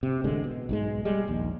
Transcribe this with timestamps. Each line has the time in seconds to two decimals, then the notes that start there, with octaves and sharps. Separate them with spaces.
0.03 C3
0.24 A1 D3 G#3
0.44 B2
0.69 B1 G#2 G#3
1.05 G3 G#3
1.28 A#1 D#2